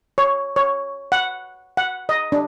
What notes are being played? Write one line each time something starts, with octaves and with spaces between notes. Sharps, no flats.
C#5
C#5
F#5
F#5
D#5
D4